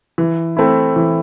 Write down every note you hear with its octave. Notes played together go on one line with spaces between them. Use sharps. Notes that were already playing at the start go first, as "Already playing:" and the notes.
E3
A3 C4 E4
E3